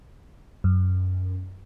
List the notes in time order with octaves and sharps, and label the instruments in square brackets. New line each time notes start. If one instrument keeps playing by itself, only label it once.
[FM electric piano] F#2